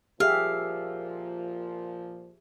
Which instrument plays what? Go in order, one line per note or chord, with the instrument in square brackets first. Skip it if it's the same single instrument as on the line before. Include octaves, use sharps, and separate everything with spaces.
[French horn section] A#2 F3 [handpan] G4 G#4 E5 [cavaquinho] F5